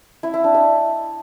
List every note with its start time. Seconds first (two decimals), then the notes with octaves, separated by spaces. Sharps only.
0.23 E4
0.34 E4
0.44 D4
0.54 D#5